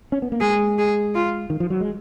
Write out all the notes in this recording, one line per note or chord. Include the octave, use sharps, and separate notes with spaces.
C#4
B3
A#3
G#3 G#4
G#4
F4
D#3
F3
F#3
G#3